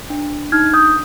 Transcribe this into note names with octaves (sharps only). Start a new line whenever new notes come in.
D4
D#4 F6 G#6
D#6 G6